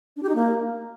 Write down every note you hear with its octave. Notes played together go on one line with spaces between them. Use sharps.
D4
G4
D#4
A#3